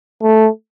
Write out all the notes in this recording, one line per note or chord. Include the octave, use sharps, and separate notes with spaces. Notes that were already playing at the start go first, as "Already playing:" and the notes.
A3